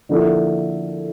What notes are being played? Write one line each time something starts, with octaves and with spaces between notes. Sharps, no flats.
D3 F3 A#3 E4